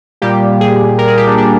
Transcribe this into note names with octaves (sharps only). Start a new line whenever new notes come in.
A#2 G3 A#3 G4
G#4
A#4
G#4
G4
D4
D4